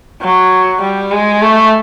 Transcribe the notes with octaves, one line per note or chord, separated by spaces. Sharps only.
F#3
G3
G#3
A3